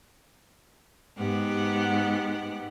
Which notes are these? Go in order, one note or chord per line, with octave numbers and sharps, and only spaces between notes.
G#2 B3 G4 F#5